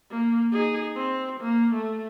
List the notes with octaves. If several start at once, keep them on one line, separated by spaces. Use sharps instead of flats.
A#3
D#4 G#4
C4
A#3
A3